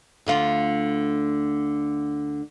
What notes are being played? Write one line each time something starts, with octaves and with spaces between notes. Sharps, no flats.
D2 D3 F4